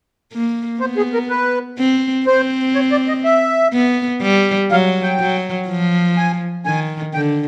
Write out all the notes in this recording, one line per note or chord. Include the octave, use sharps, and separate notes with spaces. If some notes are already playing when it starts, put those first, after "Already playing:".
A#3
B3 C5
G#4
A#4
B4
C4
C4 C5
C#5
D5
D#5
E5
B3
G3
F#3 F5
G5
F#3
F3
G#5
D#3 G#5
D3 G5